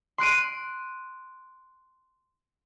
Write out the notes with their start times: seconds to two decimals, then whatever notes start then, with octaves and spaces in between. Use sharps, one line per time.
0.18 C6 F#6 D7 D#7